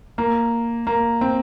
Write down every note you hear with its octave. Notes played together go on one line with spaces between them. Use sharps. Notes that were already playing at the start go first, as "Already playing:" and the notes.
A#3
A#3
C4